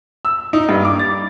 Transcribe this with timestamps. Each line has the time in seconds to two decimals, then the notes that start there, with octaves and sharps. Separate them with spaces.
0.25 E6
0.53 D#4
0.69 G2
0.85 D6
0.99 A6